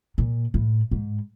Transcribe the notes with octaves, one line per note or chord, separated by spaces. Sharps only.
A#2
A2
G#2